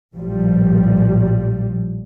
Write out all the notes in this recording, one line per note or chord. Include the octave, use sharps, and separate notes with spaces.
A#1 A2 F3 G3